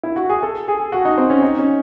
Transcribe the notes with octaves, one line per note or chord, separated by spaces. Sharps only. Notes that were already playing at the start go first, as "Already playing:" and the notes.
E4
F#4
G#4
A4
G#4
F#4
D#4
C4
C#4
D#4
C#4